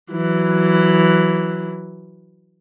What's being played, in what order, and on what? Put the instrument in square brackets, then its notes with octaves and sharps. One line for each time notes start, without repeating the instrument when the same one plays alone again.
[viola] E3 F#3